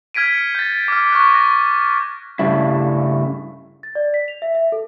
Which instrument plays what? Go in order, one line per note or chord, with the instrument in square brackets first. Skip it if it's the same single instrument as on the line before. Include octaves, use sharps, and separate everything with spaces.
[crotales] F6 G#6 B6 D7 D#7
C#7
G6 A6
D6 F6
C#6 F#6
A#6
[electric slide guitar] G2 C#3 G3 A3 E4
[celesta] A6
D5
B6
F7
E5
E5
A4